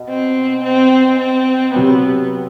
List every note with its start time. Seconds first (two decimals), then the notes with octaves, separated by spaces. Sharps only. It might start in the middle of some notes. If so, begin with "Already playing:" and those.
Already playing: B2
0.08 C4
0.64 C4
1.19 C4
1.74 C3 F#3 B3 C4